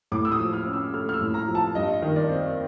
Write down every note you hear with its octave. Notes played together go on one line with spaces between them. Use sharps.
A2 D6
E6
D#6
F3
F6
C#4
E6
A3 F6
F6
E6
A2
A#5
F3
A5
G2 D#5
D#3
D5
C4